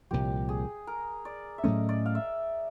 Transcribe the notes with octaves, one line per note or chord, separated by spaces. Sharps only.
C2 A#2 F3 G4
G#4
A#4
D5
E5
A2 F#3 A3 C#4 D#5
D5
F5
E5